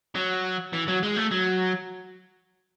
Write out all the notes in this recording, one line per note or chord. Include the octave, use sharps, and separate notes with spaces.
F#3
E3
F#3
G#3
A3
F#3